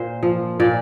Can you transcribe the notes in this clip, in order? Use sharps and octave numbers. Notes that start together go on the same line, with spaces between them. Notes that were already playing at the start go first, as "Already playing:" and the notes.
Already playing: A#2 C5
F3
A#2 D5